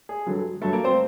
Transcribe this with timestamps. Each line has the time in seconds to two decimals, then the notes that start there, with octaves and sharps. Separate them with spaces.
0.09 G#4
0.26 G2 D3 F#3
0.61 G2 D3 F#3 A3 A4
0.73 A#3 A#4
0.84 C4 C5